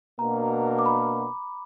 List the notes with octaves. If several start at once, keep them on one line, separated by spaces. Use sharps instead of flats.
B2 A#3 D4 F#4 A#4 A#5
D6
B5